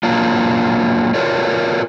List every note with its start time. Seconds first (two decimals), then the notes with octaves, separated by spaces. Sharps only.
0.03 F#3 A#3 D4 F4
1.14 F4 F#4 A#4 C#5 D5